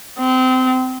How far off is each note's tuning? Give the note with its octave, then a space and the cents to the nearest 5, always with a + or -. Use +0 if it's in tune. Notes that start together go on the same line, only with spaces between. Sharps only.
C4 -25